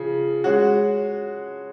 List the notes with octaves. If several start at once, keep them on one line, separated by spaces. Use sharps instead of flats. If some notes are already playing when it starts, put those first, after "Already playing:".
Already playing: C#3 F3
G#3 C#4 F#4